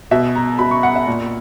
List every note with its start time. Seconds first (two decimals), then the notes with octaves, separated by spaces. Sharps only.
0.11 B2 E5
0.35 A#5
0.59 B2 B5
0.71 C#6
0.83 F#5
0.96 E5
1.07 A#2